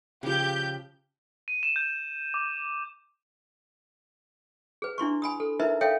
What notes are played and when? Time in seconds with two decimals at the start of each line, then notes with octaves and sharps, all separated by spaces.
0.23 C#3 F3 G4 G6
1.48 D#7
1.63 E7
1.76 G6
2.34 D6
4.82 G#4 B4
4.98 D4 E4 C6 C#6
5.22 G#5 B5 D#6
5.40 A4
5.60 D#4 E4 A#4 B4 E5 A#5
5.81 A4 C#5 E5 F5 G5